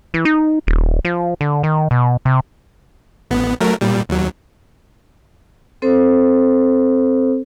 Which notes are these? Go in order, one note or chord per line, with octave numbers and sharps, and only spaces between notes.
E3
D#4
D#1
F3
D3
D#3
B2
C3
A1 B3
F#3 A3 A#4
A#2 G3
D#2 F#3
C4 A4 C5